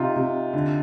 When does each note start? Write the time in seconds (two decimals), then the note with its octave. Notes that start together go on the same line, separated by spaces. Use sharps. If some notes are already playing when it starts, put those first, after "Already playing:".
Already playing: C3 D#4 F4
0.16 C3
0.53 D3